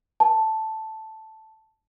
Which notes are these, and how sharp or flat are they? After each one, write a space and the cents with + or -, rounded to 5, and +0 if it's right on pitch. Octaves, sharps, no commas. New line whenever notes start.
A5 +0